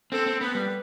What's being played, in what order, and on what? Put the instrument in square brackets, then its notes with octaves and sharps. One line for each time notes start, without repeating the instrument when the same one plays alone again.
[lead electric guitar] C4 [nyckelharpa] A4
[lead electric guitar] C4
[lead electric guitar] B3 [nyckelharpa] B4
[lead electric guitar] G3